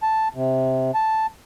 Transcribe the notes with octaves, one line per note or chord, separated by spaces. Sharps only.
A5
C3
A5